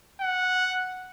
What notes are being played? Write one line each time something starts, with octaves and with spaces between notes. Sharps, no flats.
F#5